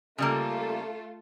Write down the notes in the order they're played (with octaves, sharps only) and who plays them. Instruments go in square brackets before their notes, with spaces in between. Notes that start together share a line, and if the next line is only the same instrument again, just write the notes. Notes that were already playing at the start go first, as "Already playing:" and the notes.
[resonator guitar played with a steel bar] C#3 G3 A#3 [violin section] A3 F4 A4